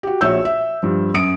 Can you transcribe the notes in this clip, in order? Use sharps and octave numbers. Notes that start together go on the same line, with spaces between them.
F#4 G4
A#1 F#4 C#5 E5 E6 G6
E5
G2 F3
F#2 D#6 D7